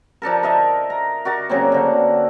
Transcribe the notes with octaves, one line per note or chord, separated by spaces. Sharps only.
F3 D4 A4 A#4
A#4 D#5 E5 A5
A#5
F#4 A#4 D5
C#3 F#3 A#3 C4
D3 C4